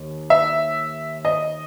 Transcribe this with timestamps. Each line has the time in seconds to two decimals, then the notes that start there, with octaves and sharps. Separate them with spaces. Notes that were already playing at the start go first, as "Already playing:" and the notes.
Already playing: D#2
0.30 E5
1.25 D#5